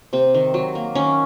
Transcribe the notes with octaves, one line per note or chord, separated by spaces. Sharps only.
C3 C4
D#3
F#3
A#3
D#3 C#4